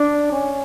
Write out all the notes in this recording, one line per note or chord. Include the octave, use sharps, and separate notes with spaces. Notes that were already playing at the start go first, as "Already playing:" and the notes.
Already playing: D4
C#4